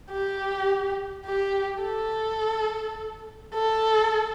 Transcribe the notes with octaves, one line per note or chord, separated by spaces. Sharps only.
G4
G4
A4
A4